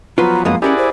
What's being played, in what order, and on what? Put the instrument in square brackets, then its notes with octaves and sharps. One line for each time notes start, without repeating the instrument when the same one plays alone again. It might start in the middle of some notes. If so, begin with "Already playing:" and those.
[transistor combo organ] F3 F#3 B3 [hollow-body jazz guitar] F4 B4 [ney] A#5
[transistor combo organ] F#2 B3 D#6 [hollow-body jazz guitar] F3 G#3 A#3 [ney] F5
[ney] C#4 [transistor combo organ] E4 G#4 D5 [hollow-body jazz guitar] G4 A#4 F#5
[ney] C5